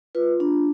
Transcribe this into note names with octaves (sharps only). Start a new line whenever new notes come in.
F4 B4
D4